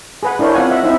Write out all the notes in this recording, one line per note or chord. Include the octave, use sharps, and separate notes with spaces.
G#4 B4 F#5
D4 E4 A#4 C5 C#5
C4 F4 F#5 G#5
D#5 E5 F#5
C4 D#4 E4 E5